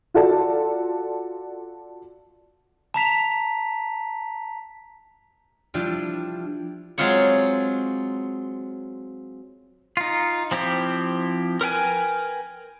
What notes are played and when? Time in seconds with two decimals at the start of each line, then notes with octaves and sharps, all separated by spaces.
0.14 F4 F#4 A4 D5 A5
2.94 A5 A#5 B6 F7
5.74 F3 G3 D4 E4 F4 G4
6.98 F#3 G#3 C4 F4 G#4 C#5
9.97 D#4 F4
10.51 F3 C4 E4 G4
11.61 A#4 B4 G5 G#5